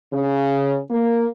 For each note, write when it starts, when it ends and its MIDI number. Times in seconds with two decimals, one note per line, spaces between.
0.13 0.79 49
0.90 1.27 58